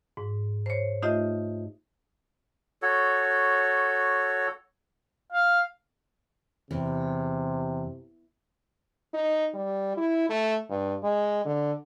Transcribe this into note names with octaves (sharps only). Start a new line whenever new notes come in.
G#2
C5 C#5
A3 D#4 F4 G4 D#5 E5
F#4 A4 C#5
F5
E2 C3
D#4
G3
E4
A3
G2
G#3
D3